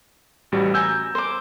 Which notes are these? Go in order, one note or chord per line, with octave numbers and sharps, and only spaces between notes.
A1 G3 F#4
G#5 A#5 E6 G6
C5 D6